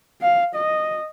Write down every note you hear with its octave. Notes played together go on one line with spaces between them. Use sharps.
F5
D#5